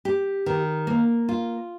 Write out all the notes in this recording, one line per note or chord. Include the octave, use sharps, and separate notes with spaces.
G4
D#3
A#3
F4